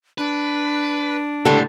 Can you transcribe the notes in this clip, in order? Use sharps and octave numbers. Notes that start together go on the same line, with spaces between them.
D4 B4
C#2 A2 D3 G3 A4